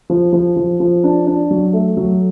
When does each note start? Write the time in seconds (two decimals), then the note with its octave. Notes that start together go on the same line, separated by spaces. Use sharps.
0.10 F3
0.33 F3
0.57 F3
0.80 F3
1.04 D4
1.27 D4
1.51 F#3
1.73 A3
1.97 F#3